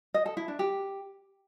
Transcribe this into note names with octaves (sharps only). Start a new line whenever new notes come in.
D#5
A4
E4
D4
G4